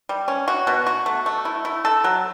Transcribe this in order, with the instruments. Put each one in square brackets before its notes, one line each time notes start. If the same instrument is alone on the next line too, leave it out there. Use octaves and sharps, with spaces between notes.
[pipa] G3
C#4
F#4
B2
F#4
A3
A3
E4
E4
A4
F#3